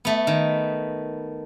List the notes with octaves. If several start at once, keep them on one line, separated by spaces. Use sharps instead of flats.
A3 B3
D#3